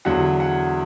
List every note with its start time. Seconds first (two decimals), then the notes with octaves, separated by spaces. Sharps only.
0.05 E2 D3 F#3 F#5
0.40 F#5